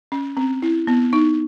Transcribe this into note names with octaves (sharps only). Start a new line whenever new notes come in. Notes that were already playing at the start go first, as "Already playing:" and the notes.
C#4
C4
E4
B3
D#4